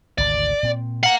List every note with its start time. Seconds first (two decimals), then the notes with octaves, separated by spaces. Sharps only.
0.18 G#1 D2 C3 D5
0.63 A#2 C4
1.03 F5 F#5 A#5